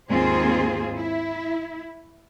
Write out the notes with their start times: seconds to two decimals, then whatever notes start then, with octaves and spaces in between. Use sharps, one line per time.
0.10 D#2 G#2 C4 F4 G#4 C5
0.97 E4